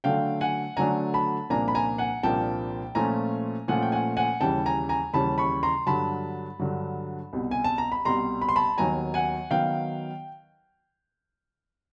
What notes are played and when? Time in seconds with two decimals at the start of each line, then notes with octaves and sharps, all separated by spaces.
0.04 D3 F#3 A3 D4 F5 G5
0.41 F#5 G#5
0.77 D3 F#3 A3 D4 G#5 A#5
1.14 A5 B5
1.50 C2 A#2 F3 A#3 D4 G#5 A#5
1.68 B5
1.75 G#5 A#5
1.98 F#5 G#5
2.23 C2 A#2 F3 A#3 D4 G5 A5
2.95 A#2 F3 A3 C#4 F4 G#5 A#5
3.68 A#2 F3 A3 C#4 F4 F#5 G#5
3.82 G5
3.92 F#5 G#5
4.17 F#5 G#5
4.41 D#2 C#3 E3 G3 G5 A5
4.66 G#5 A#5
4.89 G#5 A#5
5.13 D#2 C#3 E3 G3 A5 B5
5.38 B5 C#6
5.63 A#5 C6
5.87 G2 D3 F#3 A5 B5
6.59 G2 D3 F#3
7.33 C2 B2 G3
7.51 G#5
7.64 A5
7.78 A#5
7.92 B5
8.05 C2 B2 G3 A#5 C6
8.42 B5
8.49 C6
8.56 A5 B5
8.78 D#2 D#3 F#3 B3 G#5 A#5
9.14 F#5 G#5
9.51 D#3 F#3 B3 F5 G5